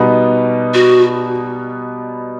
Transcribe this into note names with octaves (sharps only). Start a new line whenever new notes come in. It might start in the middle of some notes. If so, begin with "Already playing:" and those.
Already playing: B2 G3 B3 D#4
F#4